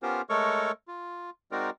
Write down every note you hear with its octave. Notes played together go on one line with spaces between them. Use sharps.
B3 C#4 F4 G4 A#4 C5
G#3 A3 A4 A#4 C#5 C#6
F4
G#3 C4 D#4 F#4 A#4 D5